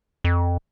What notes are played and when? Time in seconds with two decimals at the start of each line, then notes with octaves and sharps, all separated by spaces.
0.24 F2